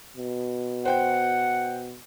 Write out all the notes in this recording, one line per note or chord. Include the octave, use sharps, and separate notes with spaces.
B2
C5 F#5 G5